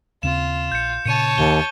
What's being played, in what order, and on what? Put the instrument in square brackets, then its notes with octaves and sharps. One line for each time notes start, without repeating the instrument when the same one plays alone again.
[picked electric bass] D#2 C#3 C4 [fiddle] F4 [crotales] E7
[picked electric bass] A#1 [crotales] G6 C#7
[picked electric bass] A#2 C#3 [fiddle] C#5 A5 [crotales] C#7 D#7
[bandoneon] D#2 [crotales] G7